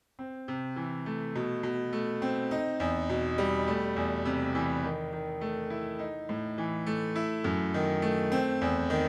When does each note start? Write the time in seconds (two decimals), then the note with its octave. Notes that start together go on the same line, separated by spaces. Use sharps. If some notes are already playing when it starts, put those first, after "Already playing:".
0.19 C4
0.48 C3
0.76 E3
1.06 A3
1.35 B2
1.63 B2
1.93 A3
2.22 C4
2.51 D#4
2.80 E2
3.09 B2
3.38 G3
3.67 A3
3.96 E2
4.25 C3
4.55 E3
4.84 D#3
5.13 D#3
5.41 A3
5.70 E4
5.99 D#4
6.29 A2
6.58 E3
6.86 A3
7.16 E4
7.44 F#2
7.74 D#3
8.02 A3
8.32 C4
8.61 E2
8.90 D#3